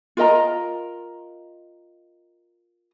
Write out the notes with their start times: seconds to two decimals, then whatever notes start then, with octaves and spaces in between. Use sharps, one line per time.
0.17 F4 A#4 D#5 A#5